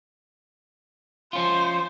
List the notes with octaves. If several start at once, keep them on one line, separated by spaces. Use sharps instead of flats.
F3 C#4 F4 C5